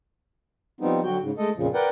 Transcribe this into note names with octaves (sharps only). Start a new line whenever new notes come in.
F3 G3 B3 C4 D#4
D3 F#3 F#4 G5
G#2 C#3
G#3 A3 A4 D#5
F2 A#2 C#3 F3
A#4 B4 D5 F#5 G5